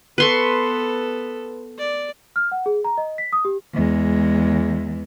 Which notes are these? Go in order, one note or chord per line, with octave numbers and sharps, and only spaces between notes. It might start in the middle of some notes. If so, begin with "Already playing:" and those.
B3 A4 B4 C6 C#6
D5
F6
F#5
G#4
A#5
D#5
B6
D#6
G4
E2 G#3